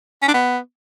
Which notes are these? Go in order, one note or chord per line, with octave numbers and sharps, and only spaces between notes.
C#4
D4
B3